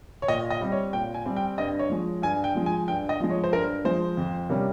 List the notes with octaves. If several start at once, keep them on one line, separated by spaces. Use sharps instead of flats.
C#5
A#2 D#5
D#5
G3 C4
C#5
A#2 G5
G#5
G3 C4
G5
G2 D#5
C#5
F3 G#3
G2 G#5
G5
F3 G#3
G#5
G2 G5
D#5
F3 G#3
C#5
C5
G2 A#4
F3 G#3 C5
F2
C3 G3 A#3 C#4